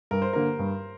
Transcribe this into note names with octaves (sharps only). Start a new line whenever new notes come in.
G2 A#4
C5
D3 A#3 A#4
G2